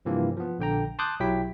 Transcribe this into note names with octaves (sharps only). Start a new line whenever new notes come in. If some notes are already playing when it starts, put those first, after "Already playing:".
G2 C3 E3 F3 A#3
F3 B3
A#1 D3 G5 A#5
A5 C6 D6 D#6 F#6 G6
B1 F#3 E4 G4 G5 B6